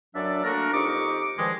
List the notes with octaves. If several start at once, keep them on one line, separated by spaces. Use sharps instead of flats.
F#2 F#3 D4 A4 D5 E5
A3 A#3 D4 F#4 A#4
F2 D#4 G4 D#5 C#6 D6
G2 D#3 F3 G#3